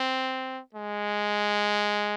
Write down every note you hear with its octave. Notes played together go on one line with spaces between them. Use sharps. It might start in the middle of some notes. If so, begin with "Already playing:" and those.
Already playing: C4
G#3